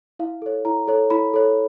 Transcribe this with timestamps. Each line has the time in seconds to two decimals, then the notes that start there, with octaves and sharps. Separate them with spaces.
0.19 E4 F5
0.42 A4 C#5
0.65 E4 A#5
0.88 A4 C#5
1.10 E4 B5
1.34 A4 C#5